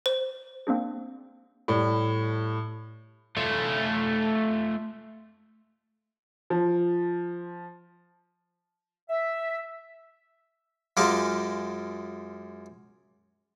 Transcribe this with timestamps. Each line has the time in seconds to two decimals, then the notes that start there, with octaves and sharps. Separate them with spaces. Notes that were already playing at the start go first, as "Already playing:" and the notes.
0.06 C5
0.67 A#3 C4 D4 G#4
1.68 A2 G3
3.37 A3 F4
6.50 F3
9.10 E5
10.97 F#2 G#3 F4 G4 F5 A5